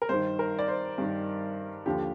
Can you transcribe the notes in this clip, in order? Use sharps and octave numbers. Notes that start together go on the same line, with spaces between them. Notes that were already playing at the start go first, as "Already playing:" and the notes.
A#4
G2 D#3 C5
A#4
D5
C5
G2 D#3
D#2 D3 F3 G4